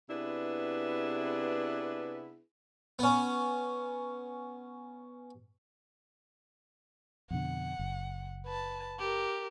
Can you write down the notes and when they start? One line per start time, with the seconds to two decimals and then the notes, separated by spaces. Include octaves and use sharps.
0.09 C3 B3 D4 E4 G#4 B4
2.99 B3 C#4
7.31 F2 B2 D3 F#5
7.79 F#1
8.46 B4 A5
8.99 G4 A#4